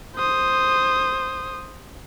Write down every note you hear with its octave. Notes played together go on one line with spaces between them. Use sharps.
C5 D#6